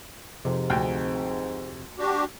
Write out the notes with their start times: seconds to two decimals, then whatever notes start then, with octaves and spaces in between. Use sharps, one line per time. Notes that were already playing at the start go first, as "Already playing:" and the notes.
0.45 F2 G#2 C3
0.70 D2 G5
1.99 D4 F#4 G4